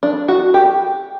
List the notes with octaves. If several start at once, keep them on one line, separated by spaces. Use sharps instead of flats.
D4
F#4
G4